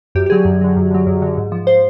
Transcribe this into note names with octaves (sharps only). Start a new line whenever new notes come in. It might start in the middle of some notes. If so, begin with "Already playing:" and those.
F#2 G4
G4
D3 F#3 G#4
F#2
D3 F#3
F#2
D3 F#3
F#2
D3 F#3
G#2
F3
C5